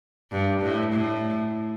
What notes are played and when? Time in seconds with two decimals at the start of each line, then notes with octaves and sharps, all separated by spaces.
0.32 G2
0.62 A2
0.92 A2